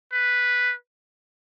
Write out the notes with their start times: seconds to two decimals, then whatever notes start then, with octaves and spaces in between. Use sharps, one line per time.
0.12 B4